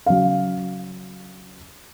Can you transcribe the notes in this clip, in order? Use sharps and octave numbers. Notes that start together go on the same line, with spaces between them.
C#3 F#3 F5